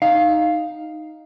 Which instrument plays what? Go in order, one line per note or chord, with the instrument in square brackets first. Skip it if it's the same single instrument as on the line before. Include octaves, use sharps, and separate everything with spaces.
[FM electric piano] D#4 [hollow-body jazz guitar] F5